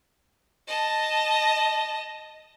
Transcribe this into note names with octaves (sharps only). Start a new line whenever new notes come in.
D#5 A5